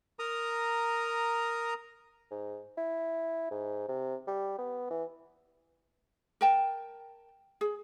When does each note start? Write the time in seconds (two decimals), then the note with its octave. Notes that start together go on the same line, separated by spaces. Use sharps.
0.19 A#4 A#5 D#6
2.31 G#2
2.77 E4
3.51 G#2
3.88 C3
4.27 G3
4.58 B3
4.90 E3
6.41 A#4 G5 A5
7.61 G#4